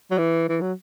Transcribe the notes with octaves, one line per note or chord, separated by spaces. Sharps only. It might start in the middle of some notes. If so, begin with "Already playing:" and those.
F#3
E3
E3
F#3